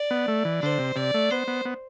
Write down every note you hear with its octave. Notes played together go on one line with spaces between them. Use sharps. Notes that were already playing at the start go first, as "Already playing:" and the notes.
Already playing: D5
B3
A3
E3
D3 C5
C3
C3 D5
A3
B3 C5
B3
B3